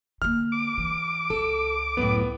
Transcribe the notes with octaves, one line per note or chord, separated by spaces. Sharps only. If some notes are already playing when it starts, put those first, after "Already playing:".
D3 A#3 F6
D6
E3
C#2 A4
F#2 A2 B3